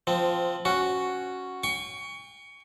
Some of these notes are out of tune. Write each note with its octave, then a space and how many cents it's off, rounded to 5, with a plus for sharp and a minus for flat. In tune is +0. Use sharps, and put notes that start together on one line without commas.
F3 +0 C4 -15
C#4 +0 F#4 +0
G5 +45 C#6 +20